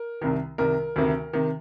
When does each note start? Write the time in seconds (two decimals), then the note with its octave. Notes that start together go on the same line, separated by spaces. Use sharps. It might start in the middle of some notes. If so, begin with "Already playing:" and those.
Already playing: A#4
0.22 C2 C3 D#3
0.58 C2 C3 D#3 A#4
0.96 D2 C3 D#3
1.33 C3 D#3